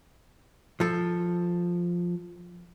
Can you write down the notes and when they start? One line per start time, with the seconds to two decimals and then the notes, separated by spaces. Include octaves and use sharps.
0.80 F3 A4